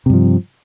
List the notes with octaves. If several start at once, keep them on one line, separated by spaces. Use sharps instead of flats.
G2 C3 F3